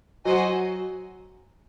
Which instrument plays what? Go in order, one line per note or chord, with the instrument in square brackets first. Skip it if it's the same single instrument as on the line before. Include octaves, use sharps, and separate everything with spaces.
[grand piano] F#3 [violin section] F#4 C5 D#5 G#5